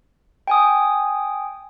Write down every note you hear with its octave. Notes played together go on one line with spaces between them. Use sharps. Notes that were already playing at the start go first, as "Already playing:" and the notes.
G5 G#5 D#6